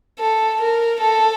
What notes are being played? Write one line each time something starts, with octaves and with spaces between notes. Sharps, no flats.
A4
A#4
A4